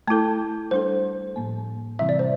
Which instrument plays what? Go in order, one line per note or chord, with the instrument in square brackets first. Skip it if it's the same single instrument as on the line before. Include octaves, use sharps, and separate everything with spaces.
[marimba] A3 E4 A4 [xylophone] A5
[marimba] G3 D4 A4 [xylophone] C5
[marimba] A2 F3 A#3
[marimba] C3 E3 G3 C4 E4 [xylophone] E5
[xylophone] D5
C5